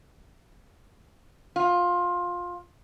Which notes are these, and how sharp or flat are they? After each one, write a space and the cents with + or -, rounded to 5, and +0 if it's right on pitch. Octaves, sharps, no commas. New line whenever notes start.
F4 +15